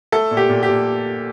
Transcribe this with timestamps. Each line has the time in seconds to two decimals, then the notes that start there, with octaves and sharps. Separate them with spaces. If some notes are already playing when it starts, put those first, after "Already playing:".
0.12 A3 A4
0.31 A#2
0.37 G4
0.49 A#2
0.63 G4
0.69 A#2